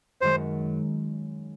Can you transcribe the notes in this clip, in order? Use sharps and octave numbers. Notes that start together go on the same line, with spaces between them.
F#2 D#3 G#3 C5